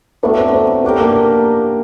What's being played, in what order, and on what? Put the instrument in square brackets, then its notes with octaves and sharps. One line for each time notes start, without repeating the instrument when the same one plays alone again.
[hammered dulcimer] A2 F#3 A3 D4 [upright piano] B3
[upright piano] C4
C4
[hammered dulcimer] A3 D4 G4 A#4 [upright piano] B3
[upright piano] A#3